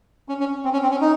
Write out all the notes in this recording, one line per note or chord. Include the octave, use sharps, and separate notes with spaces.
C#4
C#4
C4
C#4
C4
C#4
D#4